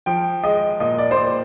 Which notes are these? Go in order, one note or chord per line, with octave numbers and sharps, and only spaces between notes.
F3 G5
G#3 D#5
A#2 D#5
D5
C5
A#2 D5